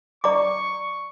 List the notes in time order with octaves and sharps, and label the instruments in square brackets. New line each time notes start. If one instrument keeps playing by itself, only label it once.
[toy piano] D5 A#5 D6 [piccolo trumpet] C#6